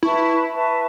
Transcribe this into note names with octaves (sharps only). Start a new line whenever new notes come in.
E4 B4 E5 A5 C#6
B4 E5 A5 C#6